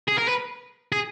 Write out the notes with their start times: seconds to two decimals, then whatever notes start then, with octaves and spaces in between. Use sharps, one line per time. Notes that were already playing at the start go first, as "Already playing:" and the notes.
0.08 G#4
0.19 A#4
0.29 B4
0.92 G#4